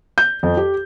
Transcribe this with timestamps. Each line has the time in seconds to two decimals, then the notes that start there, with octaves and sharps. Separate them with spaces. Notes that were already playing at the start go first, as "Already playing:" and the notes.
0.18 G6
0.43 F2
0.57 G4